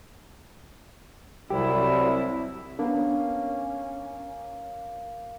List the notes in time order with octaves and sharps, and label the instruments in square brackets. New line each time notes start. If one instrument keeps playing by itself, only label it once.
[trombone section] C2 [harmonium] F#3 G3 [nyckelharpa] E4 [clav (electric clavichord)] G4
[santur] A#3 [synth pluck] B3 D4 [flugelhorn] C#4